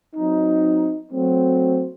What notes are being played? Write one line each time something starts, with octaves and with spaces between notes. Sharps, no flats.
F#3 C4 D#4
F#3 A3 C4